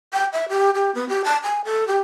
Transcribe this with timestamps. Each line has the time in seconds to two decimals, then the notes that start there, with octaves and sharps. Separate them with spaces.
0.13 G5
0.33 E5
0.49 G4
0.75 G4
0.95 B3
1.09 G4
1.24 A5
1.43 G#5
1.65 A4
1.88 G4